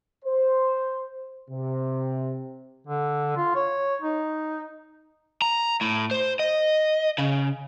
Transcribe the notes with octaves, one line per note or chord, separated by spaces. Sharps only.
C5
C3
D3
F4
C#5
D#4
A#5
A2
C5
D#5
C#3